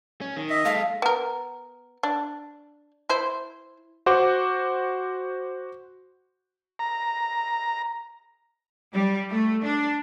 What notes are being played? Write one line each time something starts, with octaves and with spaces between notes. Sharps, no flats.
C#4
D#3
D#5 E5
G#3 A4 F5
B3 A#4
D4
E4 C5
F#4 C5 F#5 D6
A#5
G3
A3
D4